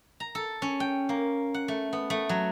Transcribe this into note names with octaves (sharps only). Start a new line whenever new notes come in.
A#5
A4
C#4
G5
A#3
F#5
A3
B3
A3
F#3